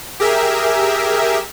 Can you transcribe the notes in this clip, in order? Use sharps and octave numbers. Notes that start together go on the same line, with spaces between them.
G4 G#4 A#4 E5